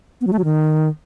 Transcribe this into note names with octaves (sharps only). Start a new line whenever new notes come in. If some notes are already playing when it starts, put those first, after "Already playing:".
B3
F#3
A3
F#3
D#3